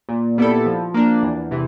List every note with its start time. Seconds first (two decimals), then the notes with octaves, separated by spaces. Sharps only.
0.09 A#2
0.38 G3 B3 E4 A4
0.66 F3
0.94 A#3 D4
1.23 E2
1.51 C3 E3